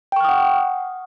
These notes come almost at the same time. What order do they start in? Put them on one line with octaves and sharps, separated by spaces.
G5 C#6 F6 D#6 F#5